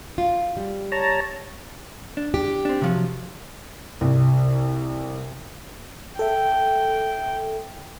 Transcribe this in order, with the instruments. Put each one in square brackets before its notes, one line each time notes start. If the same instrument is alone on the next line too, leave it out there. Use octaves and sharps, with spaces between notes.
[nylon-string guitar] F4
G3
[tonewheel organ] C#5 A5 A#5
[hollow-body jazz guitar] D4
[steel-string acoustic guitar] G4
[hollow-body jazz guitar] C4 D4
C3 F3 F#3
[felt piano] C2
[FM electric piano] A4 E5 [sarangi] G5